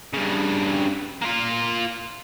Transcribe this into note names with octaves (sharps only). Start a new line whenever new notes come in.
G2 C#3
A#3 F4